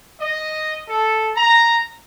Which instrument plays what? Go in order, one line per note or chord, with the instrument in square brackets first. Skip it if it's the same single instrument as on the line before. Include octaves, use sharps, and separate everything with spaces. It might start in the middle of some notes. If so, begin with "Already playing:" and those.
[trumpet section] D#5
A4
A#5